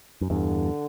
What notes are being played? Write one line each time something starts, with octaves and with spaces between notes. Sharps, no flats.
F#2
E2 G2 D3